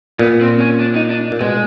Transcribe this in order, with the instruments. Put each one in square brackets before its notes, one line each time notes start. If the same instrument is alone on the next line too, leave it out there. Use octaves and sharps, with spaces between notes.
[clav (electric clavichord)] A#2 [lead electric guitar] B3
[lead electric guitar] C4
C#4
D4
D#4
D4
[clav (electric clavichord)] A#2
[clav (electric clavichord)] B2 [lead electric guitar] G#3